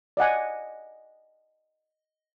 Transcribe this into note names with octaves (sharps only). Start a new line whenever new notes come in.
D5 D#5 F#5 G#5